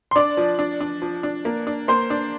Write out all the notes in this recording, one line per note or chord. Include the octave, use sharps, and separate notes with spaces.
C6
D4 D5 D6
F3
D4
D4
F3
D4
A#3
D4
A#3 C5 C6
D4